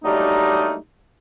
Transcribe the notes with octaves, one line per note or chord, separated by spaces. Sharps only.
F#3 G3 A3 A#3 D4 D#4